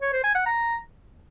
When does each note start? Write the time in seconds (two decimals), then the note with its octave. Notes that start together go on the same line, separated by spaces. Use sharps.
0.02 C#5
0.13 C5
0.24 G#5
0.35 F#5
0.46 A#5